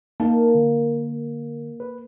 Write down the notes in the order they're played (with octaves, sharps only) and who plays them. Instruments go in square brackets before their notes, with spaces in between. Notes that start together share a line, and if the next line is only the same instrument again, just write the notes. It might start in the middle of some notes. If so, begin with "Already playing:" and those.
[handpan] A#3 [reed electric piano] D#4 A5
[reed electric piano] D3
B4